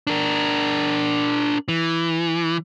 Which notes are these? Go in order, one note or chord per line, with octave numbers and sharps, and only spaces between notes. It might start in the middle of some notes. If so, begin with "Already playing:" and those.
D4 A#4
E3